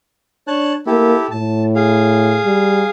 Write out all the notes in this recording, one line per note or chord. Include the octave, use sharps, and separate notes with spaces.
D4 C#5 A5 F#6
A#3 E4 G4 A4
A2 A5
G#4 F5
G3